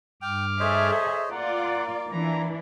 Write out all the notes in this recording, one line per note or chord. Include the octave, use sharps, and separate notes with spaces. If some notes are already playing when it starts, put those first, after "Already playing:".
G2 G5 D6 F6
G#4 A4 C5 C#5 D#5 E5
A#3 F4 D5 F#5
E3 D4 E4 A#5